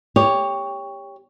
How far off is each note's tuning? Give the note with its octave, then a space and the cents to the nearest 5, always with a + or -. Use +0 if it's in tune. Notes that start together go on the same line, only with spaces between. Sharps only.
G4 +20 C#5 +10